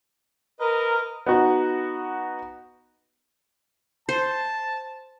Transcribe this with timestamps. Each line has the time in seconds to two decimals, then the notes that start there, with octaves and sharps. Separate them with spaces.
0.60 A#4 B4 D#5
1.26 B3 D#4 F#4
4.09 C5 A5